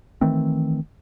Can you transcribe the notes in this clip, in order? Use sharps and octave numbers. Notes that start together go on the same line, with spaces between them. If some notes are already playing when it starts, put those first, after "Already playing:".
D#3 E3 A3 C4